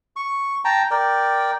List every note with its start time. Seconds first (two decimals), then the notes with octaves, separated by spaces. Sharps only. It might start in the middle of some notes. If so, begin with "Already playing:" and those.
0.16 C#6
0.65 G5 A5 A#5
0.91 A#4 D5 G5